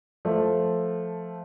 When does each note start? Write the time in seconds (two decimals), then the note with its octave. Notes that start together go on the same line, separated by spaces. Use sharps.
0.25 F3 A3